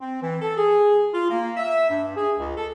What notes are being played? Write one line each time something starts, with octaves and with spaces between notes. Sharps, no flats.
C4
E3
A4
G#4
F4
A#3
E5
G2
G#4
C#2
A4